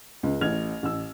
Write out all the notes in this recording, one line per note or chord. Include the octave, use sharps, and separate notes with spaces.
C#2
A1 A2 F6 G#6 F7
A1 E6